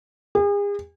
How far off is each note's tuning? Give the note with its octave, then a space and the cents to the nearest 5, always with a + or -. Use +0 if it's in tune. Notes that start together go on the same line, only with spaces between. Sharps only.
G#4 -40